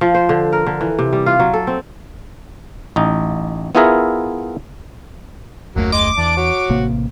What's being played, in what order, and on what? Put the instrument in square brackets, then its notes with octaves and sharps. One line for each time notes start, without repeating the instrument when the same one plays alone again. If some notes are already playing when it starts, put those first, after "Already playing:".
[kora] F3
C5
D3
A#4
D3
E3
C3
G3
F4
F#3
A4
C4
[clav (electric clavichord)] A1 D#4
B3 E4 F4 G#4 A#4 E5
[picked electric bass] F#1 D#2 A3 [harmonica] F#3 A#3
[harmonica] D#5 C6 [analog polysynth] D6
[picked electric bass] E2 [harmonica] D5 A5
[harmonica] F#4 C#5
[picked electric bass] A1 C3 A#3